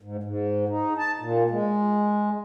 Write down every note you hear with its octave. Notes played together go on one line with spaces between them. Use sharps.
G#2
G#2
D#4
A5
A#2
G#3